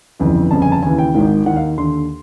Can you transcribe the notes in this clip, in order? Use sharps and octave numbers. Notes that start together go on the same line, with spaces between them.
G1 F2 C#3 E3
G1 F2 C#3 A5
G#5
A5
D#2 C#3 E3 G#5
G5
G#1 G#2 D#3
D#2 D#3 F#5
F5
D#2 D3 C6